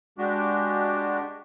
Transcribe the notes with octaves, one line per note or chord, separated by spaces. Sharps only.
G#3 D4 F#4 G4